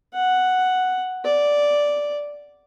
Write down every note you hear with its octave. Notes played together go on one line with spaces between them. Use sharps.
F#5
D5